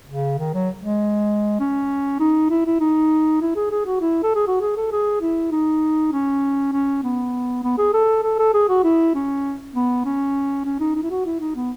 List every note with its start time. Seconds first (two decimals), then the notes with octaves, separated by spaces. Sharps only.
0.08 C#3
0.38 D#3
0.54 F#3
0.84 G#3
1.60 C#4
2.20 D#4
2.50 E4
2.66 E4
2.80 D#4
3.41 E4
3.56 G#4
3.71 G#4
3.86 F#4
4.01 E4
4.23 A4
4.35 G#4
4.47 F#4
4.61 G#4
4.77 A4
4.92 G#4
5.21 E4
5.51 D#4
6.12 C#4
6.72 C#4
7.03 B3
7.63 B3
7.78 G#4
7.94 A4
8.23 A4
8.39 A4
8.54 G#4
8.69 F#4
8.84 E4
9.15 C#4
9.75 B3
10.05 C#4
10.65 C#4
10.80 D#4
10.95 D#4
11.03 E4
11.10 F#4
11.26 E4
11.40 D#4
11.56 B3